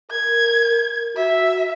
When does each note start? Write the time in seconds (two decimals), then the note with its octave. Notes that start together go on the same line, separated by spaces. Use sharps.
0.12 A#4 G#6
0.74 A#4
1.16 F#4 E5